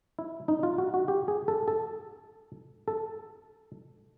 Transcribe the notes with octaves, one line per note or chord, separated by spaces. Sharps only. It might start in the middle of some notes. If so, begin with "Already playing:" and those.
E4
D#4
F4
F#4
F#4
G4
G#4
A4
A4
A4